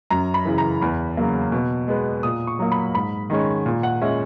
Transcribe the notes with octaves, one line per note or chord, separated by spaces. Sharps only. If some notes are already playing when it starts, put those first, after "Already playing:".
F#2 A#5
B5
C#3 E3
A#5
E2 B5
C#3 F#3 A#3
B2
G#3 B3
A#2 D#6
C#6
F#3 A#3
B5
G#2 B5
D#3 G#3 C#4
A#2
F#5
G#3 C#4 E5